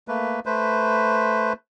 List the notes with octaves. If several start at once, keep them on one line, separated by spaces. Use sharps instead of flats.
A3 A#3 B4
A3 B4 C5